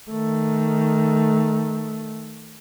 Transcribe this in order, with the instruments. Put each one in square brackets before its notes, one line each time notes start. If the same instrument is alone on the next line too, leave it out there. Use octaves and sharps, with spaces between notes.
[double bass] D#3 A3